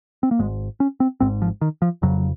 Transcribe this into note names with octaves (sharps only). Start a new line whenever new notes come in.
C4
A#3
G#1 G#2 G#3
C#4
C4
G#1 G#2 C4
F3
D#3
F3
F1 F2 C#3 F#3